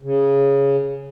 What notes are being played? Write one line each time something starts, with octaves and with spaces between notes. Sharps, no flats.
C#3